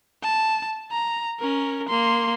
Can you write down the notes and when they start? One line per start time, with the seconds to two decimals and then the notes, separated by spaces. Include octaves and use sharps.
0.23 A5
0.92 A#5
1.40 C#4 A#4
1.89 A#3 C6